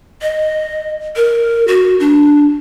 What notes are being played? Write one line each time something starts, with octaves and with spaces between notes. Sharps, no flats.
D#5
A#4
F#4
D4